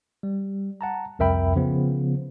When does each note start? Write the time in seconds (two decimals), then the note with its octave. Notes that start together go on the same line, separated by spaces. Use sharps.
0.23 G3
0.81 F#5 A5 A#5
1.19 C2 F2 A#4 E5 G5 B5
1.56 C#3 F3 B3